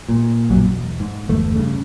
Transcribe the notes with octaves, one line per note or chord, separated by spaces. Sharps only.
A#2
B1 F#2 A#2 F#3
E1
G#2
G1 E2 A3
G2 C#3